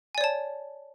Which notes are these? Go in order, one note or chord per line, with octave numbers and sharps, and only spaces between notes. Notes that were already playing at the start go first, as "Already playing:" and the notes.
C#5 D5 G#5 A5